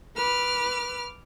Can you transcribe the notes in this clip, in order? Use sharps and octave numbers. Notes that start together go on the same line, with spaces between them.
B4 D6 F6